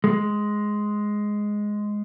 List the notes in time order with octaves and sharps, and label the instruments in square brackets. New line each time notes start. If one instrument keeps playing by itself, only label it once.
[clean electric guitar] G#3